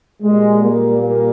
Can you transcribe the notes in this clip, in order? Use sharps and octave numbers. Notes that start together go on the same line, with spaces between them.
A#2 G3 G#3
A#3
A#3